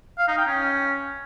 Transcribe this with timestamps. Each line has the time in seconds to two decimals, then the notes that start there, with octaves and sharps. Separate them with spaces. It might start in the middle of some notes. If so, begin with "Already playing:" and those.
0.18 F5
0.28 D#4
0.37 G5
0.47 C#4